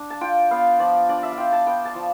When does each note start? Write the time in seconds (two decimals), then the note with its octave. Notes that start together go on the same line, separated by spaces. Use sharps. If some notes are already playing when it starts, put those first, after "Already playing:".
Already playing: D4
0.10 A5
0.21 F4 G5
0.51 B3 F5
0.79 F3 D5
1.08 D4 D5
1.23 E5
1.32 F5
1.37 F4 G5
1.52 A5
1.66 B3 G5
1.85 A5
1.95 F3